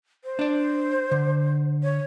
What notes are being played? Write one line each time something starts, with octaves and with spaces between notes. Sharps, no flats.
C5
D4 D5
D3
C#5